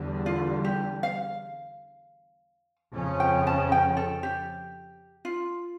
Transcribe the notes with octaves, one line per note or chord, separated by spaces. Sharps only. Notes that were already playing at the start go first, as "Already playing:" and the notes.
Already playing: E2 D3 G3
F4
G4
F5
F2 C#3 F3 C#4
G5
A5
G5
A4
G4
F4